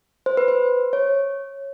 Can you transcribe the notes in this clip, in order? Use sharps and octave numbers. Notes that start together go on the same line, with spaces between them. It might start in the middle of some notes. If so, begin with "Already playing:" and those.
C5
B4
C5
C#5